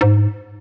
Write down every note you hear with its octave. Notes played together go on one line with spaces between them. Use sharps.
G#2